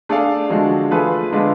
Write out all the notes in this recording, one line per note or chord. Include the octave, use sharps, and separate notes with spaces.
A3 D4 G#4 D5 F5
D3 F3 G#3 D4 F#4
F3 A3 F4 G#4 B4
D3 G#3 D4 F4 B4